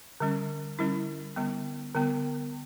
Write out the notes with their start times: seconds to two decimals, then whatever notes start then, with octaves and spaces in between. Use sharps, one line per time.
0.20 D3 G3 C#4
0.79 D3 G3 C#4 E4
1.36 D3 G3 B3
1.95 D3 G3 B3